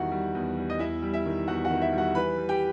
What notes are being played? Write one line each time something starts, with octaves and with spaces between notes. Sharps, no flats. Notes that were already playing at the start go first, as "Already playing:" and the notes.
Already playing: E2 D#3 G3 E4 F#4 F#5
G3
E2
G3
D#5
E2 E4 E5
G3
E4 E5
D#3
E2 F#4 F#5
F#4 F#5
D#3
E4 E5
G3
F#4 F#5
E3 B4 B5
G3
G4 G5